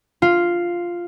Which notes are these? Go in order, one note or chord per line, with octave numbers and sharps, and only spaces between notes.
F4